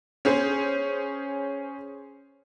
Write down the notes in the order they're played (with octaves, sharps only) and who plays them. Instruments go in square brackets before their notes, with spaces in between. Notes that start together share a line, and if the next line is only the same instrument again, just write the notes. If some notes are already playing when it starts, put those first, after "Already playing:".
[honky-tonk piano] C#4 G#4 C5